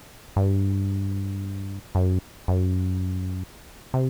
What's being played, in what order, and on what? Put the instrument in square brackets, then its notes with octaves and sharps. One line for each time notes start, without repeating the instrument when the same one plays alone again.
[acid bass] G2
F#2
F#2
C3